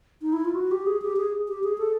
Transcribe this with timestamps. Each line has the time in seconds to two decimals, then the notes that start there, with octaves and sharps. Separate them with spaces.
0.22 D#4
0.33 E4
0.45 F4
0.55 F#4
0.71 G4
0.86 G#4
1.02 G4
1.16 G#4
1.48 G4
1.64 G#4
1.78 A4